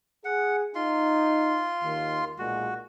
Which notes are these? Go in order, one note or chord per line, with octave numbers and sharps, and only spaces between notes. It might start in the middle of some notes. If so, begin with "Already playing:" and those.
G#4 F#5
D#4 F4 C6
D#2 D#3
B1 A#2 G#3 F#4